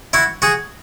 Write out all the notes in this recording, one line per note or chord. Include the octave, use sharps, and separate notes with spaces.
E4 F#4
F#4 G#4